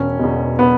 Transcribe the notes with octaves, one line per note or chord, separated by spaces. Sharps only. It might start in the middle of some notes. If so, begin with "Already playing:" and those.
Already playing: E1 C#4
E2 B2
B3